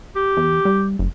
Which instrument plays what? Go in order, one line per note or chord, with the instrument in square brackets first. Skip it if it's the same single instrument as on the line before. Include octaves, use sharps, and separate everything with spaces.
[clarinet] G4
[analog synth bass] E2
G3
F#1